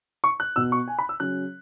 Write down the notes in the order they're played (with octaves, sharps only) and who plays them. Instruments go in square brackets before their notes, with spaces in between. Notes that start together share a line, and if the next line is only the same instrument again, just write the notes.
[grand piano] C#6
F#6
B2 B3 E6
C#6
G#5
B5
E6
C#3 F#3 C#4 F#6